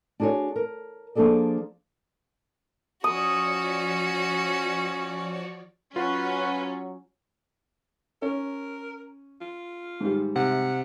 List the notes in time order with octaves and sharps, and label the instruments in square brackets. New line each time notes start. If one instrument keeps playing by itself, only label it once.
[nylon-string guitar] D4 F#4 G#4 C5 C#5
A#4
F3 A#3 D4 G#4 A4 D5
[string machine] F3 C#5 D5 [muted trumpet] C#4 [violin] F#4 [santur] D#6
[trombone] F#3 [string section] C#4 [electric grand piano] F4 [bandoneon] F#4 B4
[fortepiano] C#4 [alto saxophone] A#4
[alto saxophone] F4
[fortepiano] G#2 D#3 G3
[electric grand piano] C3 [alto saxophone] F#5